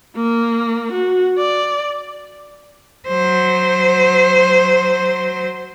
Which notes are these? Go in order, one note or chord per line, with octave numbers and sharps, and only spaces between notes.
A#3
F#4
D5
F#3 C5